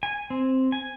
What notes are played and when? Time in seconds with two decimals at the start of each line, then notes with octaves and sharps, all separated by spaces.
0.03 G#5
0.30 C4
0.72 G#5